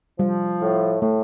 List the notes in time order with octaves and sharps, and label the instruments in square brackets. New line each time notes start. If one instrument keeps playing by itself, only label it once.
[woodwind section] F3 [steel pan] G3
[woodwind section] A2
[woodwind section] A2 [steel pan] A3